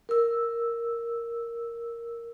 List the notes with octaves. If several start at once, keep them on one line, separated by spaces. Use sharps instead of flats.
A#4 E6